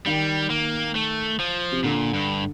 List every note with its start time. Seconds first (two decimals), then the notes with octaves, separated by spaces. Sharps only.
0.06 D#3 G3
0.50 A#3
0.95 A3
1.39 F3
1.72 C3
1.84 A#2 D3
2.14 G2